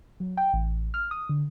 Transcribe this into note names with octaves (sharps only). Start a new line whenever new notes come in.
F#3
G5
A1
F6
D#6
D3